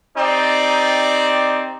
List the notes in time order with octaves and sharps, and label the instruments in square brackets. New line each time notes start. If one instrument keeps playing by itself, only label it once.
[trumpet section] C4 D#4 G4 D5